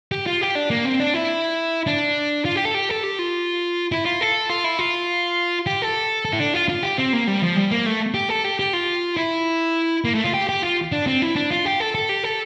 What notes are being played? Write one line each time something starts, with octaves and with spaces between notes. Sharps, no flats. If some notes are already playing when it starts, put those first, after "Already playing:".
G4
F4
G4
D4
A#3
C4
D4
E4
D4
F4
G4
A4
G4
A4
G4
F4
E4
F4
A4
F4
E4
F4
G4
A4
A4
E4
D4
F4
F4
G4
C4
A#3
G3
F3
G3
A#3
A3
G4
A4
G4
G4
F4
E4
A#3
A3
F4
G4
G4
F4
D4
C4
E4
D4
F4
G4
A4
A4
G4
A4